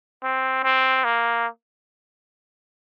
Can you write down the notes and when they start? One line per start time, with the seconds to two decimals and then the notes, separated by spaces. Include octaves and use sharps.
0.24 C4
0.64 C4
1.05 A#3